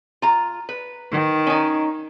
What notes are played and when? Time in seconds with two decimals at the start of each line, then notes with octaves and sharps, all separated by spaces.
0.22 F4 A#5
0.69 B4
1.11 D#3
1.47 C#4 D#4